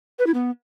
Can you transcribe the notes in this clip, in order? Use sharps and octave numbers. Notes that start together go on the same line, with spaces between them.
B4
E4
B3